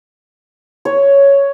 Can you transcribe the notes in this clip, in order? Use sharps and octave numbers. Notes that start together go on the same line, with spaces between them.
C#5